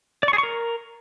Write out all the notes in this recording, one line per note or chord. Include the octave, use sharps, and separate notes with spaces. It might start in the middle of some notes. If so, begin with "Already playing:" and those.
D5
C#6
G#4
C#6
A#4